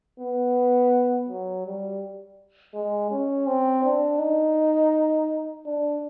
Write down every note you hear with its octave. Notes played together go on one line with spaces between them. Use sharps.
B3
F#3
G3
G#3
C#4
C4
D4
D#4
D4